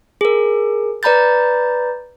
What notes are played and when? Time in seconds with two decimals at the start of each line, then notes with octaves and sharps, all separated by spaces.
0.21 G#4 A#4
1.03 B4 D5 A#5 B5 G6 A6